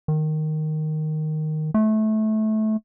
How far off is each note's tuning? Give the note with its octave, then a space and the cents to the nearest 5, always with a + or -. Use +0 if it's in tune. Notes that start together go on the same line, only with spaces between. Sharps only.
D#3 -5
A3 -20